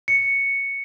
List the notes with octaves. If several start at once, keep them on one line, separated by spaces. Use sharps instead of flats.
C#7